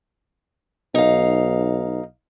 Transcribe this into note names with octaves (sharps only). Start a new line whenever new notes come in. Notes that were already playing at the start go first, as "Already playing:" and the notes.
B1 D#4 F5